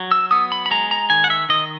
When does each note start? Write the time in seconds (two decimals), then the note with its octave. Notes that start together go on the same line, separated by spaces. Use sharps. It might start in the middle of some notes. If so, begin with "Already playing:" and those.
Already playing: F#3
0.11 E6
0.31 B3 D#6
0.52 B5
0.66 B5
0.71 G#3 A#5
0.91 A#5
1.10 D#3 G#5
1.24 F#5
1.30 E5
1.49 D#3 D#5